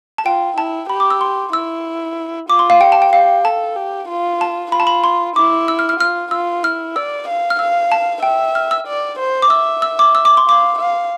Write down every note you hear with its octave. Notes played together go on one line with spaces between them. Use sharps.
A5
F4 G5
E4 A5
G4 B5
D6
E6
C6
E4 E6
F4 D6
C6
F5
G4 G5
A5
G5
G4 F5
A4 A5
G4
F4
A5
F4 B5
A5
B5
C6
E4 D6
E6
F6
F6
F4 F6
F4 E6
E4 F6
D5 E6
F5
F6
F5 E6
A5
E5 G5
F6
E6
D5
C5
D6
E5 E6
E6
D6
E6
D6
C6
F5 D6
F5